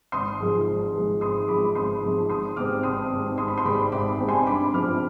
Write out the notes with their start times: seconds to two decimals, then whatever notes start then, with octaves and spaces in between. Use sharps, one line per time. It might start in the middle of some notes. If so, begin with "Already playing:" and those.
0.12 G#1 C6 D#6
0.40 G#2 F3 G#3
0.68 G#1
0.94 G#2 F3 G#3
1.21 G#1 C6 D#6
1.48 G#2 F3 G#3 B5 D6
1.75 G#1 C6 D#6
2.02 G#2 F3 G#3
2.30 G#1 C6 D#6
2.56 G#2 G3 C4 D6 F6
2.83 G#1 C6 D#6
3.11 G#2 G3 C4
3.37 G#1 C6 D#6
3.48 B5
3.58 C6
3.65 G#2 G3 C4 B5 D6
3.92 G#1 B5 D6
4.19 G#2 G3 C4
4.28 G#5 C6
4.47 G2 B5 D6
4.73 F3 C4 D6 F6